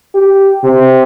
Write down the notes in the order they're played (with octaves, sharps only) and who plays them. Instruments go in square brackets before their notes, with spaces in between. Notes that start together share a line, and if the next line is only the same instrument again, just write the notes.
[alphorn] G4
C3